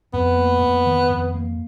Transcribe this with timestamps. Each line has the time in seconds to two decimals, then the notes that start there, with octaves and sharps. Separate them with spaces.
0.13 F2 B3
0.37 A#3
0.62 F2
0.86 D#3
1.10 F2
1.35 A#3